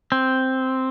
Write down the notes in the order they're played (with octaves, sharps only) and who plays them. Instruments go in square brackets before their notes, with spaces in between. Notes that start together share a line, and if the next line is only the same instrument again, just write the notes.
[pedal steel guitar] C4